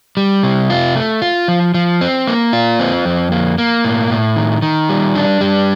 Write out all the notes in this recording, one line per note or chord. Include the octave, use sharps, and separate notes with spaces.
G3
C3
F4
A3
F4
F3
F3
C4
A#3
F4
C4
F2
A#3
A#3
A2
A2
D#3
D#3
G3
D4
G3